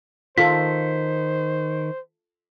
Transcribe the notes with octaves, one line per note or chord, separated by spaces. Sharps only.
D#3 F4 A4 C5 B6